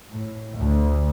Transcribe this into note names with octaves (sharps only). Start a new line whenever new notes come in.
A2
D2